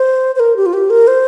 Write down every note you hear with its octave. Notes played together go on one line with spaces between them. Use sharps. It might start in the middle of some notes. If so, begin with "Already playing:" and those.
Already playing: C5
C5
A#4
G4
F4
G4
A#4
C5